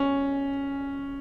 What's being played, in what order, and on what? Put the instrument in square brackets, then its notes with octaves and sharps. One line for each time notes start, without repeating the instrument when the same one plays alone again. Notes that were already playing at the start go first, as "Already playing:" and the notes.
Already playing: [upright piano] C#4